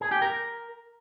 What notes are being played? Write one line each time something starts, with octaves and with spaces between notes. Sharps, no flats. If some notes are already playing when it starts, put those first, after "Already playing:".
G#4
G4
A#4